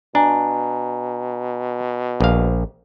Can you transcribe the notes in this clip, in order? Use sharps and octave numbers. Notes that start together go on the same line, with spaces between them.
B2 D4 G#5 A#5
A#1 F5